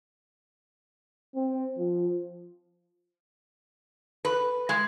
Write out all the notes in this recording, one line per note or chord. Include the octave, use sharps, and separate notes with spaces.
C4
F3
B4
G#3